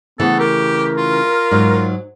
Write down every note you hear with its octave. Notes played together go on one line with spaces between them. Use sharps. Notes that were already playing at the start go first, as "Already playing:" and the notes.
C#3 E3 A3 B3 A4
G4 A#4
F4
G#2 F#3